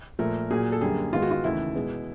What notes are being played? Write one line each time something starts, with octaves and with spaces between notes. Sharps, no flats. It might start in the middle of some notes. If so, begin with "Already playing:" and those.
A#2 F3 A3 A#4
A#2 F#3 A#3 G#4
A4
F#2 D3 G3 A#3 G#4
G#2 D#3 G#3 B3 F4
F#4
F4
D#2 C#3 E3 A3 E4
B2 G#3 B3